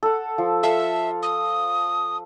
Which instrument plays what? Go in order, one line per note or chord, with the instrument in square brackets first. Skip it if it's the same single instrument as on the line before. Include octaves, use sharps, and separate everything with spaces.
[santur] A4 F#5
F3
[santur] A4 F5 [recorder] E5
[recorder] D#6